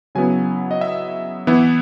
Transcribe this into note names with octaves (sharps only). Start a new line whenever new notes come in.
C#3 F#3 B3 E4 G#5
D#5
E5
E3 B3 E4